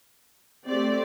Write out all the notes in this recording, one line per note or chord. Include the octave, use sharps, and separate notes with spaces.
A3 C4 G4 D5